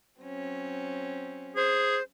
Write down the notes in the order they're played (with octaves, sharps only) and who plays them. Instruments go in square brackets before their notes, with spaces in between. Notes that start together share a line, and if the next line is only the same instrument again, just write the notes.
[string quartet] F#3 C4 C#4
[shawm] G#4 [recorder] C5